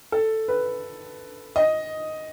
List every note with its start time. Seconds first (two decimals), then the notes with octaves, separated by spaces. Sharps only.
0.12 A4
0.48 B4
1.56 D#5